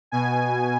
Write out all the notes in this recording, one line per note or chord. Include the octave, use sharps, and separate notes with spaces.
B2 G#5